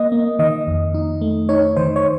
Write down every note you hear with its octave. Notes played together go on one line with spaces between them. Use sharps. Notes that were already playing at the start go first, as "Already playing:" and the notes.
Already playing: A#3 D#5
A#3
D#3 D#5
F2
D#4
A3
D#4 C#5
D#3 C5
C#5